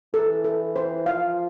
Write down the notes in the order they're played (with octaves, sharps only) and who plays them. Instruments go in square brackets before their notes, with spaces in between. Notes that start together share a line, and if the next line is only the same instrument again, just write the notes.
[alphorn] E3 [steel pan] A4
[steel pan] A4
C5
[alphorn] F3 [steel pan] F5